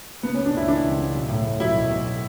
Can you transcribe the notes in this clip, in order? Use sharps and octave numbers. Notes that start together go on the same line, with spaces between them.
C#3 B3
C#4
C#3
D4
C#2 E4
E3 D4
C#2
C#3
B1
A2
A2
F#3 E4
B1
B1